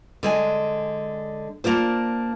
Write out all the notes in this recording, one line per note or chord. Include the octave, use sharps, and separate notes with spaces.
D3 G#3 G#5
A#3 D4 F4 C5